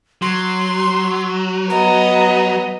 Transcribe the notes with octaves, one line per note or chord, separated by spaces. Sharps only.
F#3 C6
B3 D#5 A#5